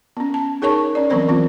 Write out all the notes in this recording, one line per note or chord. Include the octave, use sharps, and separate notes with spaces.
B3 C#4
A5
D#4 G#4 A#4 C#5 A5 C#6
C#4 D5
E3 F#3 B3 C4 A#4 C5
E3 B3 C4 F4